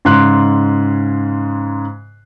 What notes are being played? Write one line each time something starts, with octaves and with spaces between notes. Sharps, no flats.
G#2 C#3 C6 F#6